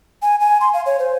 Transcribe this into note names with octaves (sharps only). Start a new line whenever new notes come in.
G#5
G#5
C6
F5
C#5
C5